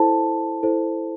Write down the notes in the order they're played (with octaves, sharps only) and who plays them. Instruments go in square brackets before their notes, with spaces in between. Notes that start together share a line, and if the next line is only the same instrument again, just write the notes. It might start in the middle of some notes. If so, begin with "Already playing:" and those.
Already playing: [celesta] E4 A4 C5 A5
E4 A4 C5